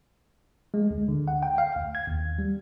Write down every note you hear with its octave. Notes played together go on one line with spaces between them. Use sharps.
G#3
D2
D3
F#5
G5
F5
D2
G#6
D#2
G3